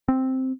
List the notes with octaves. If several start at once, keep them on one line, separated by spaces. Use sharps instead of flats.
C4